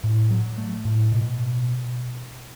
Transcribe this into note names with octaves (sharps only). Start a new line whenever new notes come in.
A2
F#3
A3
A2
B2